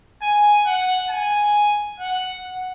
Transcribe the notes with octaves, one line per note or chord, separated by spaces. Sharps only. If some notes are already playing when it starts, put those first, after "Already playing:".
G#5
F#5
G#5
F#5
F#5